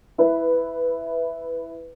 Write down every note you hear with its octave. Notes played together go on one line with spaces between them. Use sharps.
E4 B4